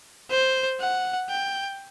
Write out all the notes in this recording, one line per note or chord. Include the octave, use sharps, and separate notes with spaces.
C5
F#5
G5